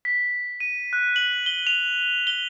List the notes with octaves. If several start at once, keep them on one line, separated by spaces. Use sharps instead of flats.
B6
D#7
F#6
F#7
G7
F7
G7